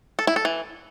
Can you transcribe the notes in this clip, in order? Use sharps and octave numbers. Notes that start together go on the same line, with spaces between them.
A4
E4
A4
E3